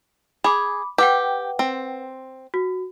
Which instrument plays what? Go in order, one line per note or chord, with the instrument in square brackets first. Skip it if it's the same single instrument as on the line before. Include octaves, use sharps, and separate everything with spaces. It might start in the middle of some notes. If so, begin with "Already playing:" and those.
[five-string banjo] G#4 [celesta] B5 D6
[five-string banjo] G4 [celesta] B4 F#5 G5
[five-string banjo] C4
[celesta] F#4